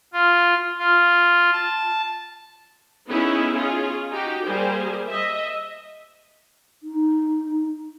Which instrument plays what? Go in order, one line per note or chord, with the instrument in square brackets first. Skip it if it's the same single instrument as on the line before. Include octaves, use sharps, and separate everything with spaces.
[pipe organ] F4
F4
A5
[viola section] B3 C#4 D#4 E4 G#4
C#4 F4 G#4
D#4 F#4 G4 G5
G3 A#3 G#4 C5
D#5 E5
[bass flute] D#4